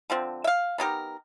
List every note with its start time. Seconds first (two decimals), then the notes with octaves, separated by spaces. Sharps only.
0.10 D3 F3 C4
0.44 E5 F5
0.78 B3 D#4 G4 A#4